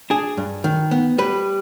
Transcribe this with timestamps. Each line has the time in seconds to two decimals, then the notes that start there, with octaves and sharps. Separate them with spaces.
0.10 D4 G#4
0.37 G2
0.64 D#3
0.91 B3
1.18 G3 B4